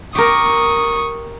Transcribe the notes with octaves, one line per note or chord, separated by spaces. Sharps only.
G4 A#4 C#6 D#6